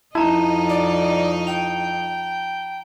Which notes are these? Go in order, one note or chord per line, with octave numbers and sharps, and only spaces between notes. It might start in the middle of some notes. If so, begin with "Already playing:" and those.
F2 D#4 E4 D#5 A5 A#5
D5
G5 F7